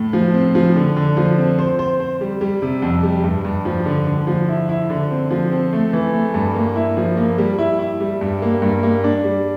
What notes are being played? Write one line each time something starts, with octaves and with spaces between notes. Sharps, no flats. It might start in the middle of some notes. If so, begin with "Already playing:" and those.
Already playing: A2
F3
C4
F3
D3
D3
F3
C4
C5
C5
C5
G3
G3
C3
F2
G3
G2
G2
F3
D3
D3
F3
E4
E4
D3
C4
F3
C4
A3
E3
A3
G2
A#3
E4
F3
A#3
G3
E4
E4
G3
G2
A#3
G2
A#3
D4
G3